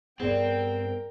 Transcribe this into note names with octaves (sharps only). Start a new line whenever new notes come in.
G2 B3 C4 G#4 A#4 D5 G5